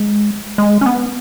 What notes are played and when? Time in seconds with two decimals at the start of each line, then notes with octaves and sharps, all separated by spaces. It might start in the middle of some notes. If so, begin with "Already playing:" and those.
Already playing: G#3
0.58 G#3
0.81 C#4
0.86 B3